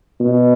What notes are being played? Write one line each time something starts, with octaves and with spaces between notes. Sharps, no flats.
B2